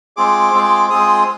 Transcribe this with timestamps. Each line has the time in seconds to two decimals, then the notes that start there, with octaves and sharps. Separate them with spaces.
0.17 G#3 C4 F4 G#4 D6
0.54 G#3 C4 F4 G#4
0.90 G#3 C4 F4 G#4 D#6